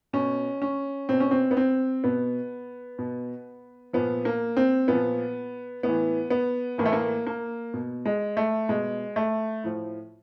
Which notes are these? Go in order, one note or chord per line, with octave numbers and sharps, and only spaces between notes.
B2 C#4
C#4
B2 C4
C#4
C4
B3
C4
B2 B3
B2
A#2 F3 B3
A#3
C4
A#2 F3 B3
A2 E3 B3
B3
A2 E3 A#3
A3
A#3
A#3
B2
G#3
A3
B2 G#3
A3
A2 F3